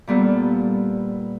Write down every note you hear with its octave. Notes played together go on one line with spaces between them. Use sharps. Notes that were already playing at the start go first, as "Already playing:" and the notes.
A#2 G3 B3 A4